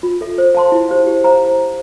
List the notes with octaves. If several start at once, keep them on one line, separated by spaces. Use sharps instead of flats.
F4
A4 E5
C5
F5 A5 C6
E4
G4 C5 F5
G4
C5 F5 A#5